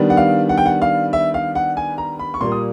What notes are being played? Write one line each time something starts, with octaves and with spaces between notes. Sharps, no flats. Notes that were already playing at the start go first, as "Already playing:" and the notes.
Already playing: D#3 G3 B3 D4
F#5
F5
F#5
G5
F#5
F5
E5
F5
F#5
G#5
A#5
B5
C#6
A#2 G3 A#3 C6
D#6